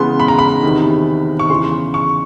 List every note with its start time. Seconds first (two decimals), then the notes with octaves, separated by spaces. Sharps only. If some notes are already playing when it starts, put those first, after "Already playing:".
Already playing: C#3 E3 G#3 B3 C6
0.20 B5
0.28 A#5
0.39 B5
0.63 E2 C3 D#3
1.39 C#6
1.50 E2 C#3 E3 C6
1.94 C#6